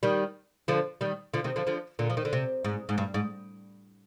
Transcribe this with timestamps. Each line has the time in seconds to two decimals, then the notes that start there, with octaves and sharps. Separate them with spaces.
0.03 D#3 G3
0.68 D3 F3
1.01 D#3 G3
1.34 D3 F3
1.44 C3 D#3
1.56 D3 F3
1.67 D3 F3
1.99 A#2 D3
2.10 F3
2.17 D#3
2.25 D3
2.33 C3
2.64 G#2
2.89 G#2
2.98 G2
3.14 G#2